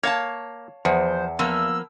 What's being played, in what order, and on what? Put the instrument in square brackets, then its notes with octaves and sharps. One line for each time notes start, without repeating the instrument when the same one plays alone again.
[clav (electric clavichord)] A#3 [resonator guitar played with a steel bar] C#5 F5 A5
[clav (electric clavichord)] E2 [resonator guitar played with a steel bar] F3 [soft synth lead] C5
[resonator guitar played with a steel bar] F3 A#3 B3 [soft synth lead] E6